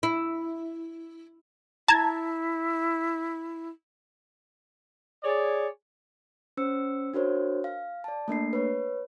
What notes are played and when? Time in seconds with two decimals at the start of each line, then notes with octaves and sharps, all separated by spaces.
0.03 E4
1.88 E4 A5 A#5 G#6
5.24 G#4 C#5 D5
6.57 C#4 C5 E6 C#7
7.14 D4 F#4 A#4 C5 C#5
7.64 F5
8.04 D5 A5
8.28 A3 A#3 D4 C7
8.53 B4 C#5